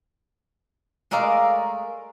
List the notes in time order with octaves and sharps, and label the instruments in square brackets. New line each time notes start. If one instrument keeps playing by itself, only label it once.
[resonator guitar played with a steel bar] G#3 A3 A#4 D5 F5